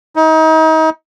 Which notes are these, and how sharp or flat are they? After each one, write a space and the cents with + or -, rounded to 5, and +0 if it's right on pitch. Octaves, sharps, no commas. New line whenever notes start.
D#4 +35